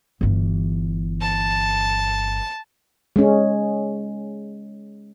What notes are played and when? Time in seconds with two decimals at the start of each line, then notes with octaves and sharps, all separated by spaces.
0.21 G1 E3
1.21 A5
3.16 G#3 C#4